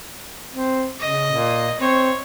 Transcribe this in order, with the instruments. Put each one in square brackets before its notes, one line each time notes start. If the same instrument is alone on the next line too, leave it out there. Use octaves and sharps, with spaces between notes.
[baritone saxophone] C4
[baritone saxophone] C#3 [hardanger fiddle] D#5
[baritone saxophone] A#2
[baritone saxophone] C4 [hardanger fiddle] C#5